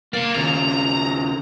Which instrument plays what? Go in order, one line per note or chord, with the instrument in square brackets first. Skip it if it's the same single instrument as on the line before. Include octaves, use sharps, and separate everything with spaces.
[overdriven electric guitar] A#3 [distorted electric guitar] D5 C6
[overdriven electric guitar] D#2 C#3 [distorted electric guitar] A#5